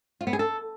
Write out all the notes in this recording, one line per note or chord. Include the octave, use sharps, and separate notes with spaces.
F4
B3
G#4
A4